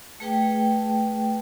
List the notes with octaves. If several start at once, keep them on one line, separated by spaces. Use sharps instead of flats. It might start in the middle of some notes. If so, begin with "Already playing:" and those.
A3 G#4 B4 G5 A5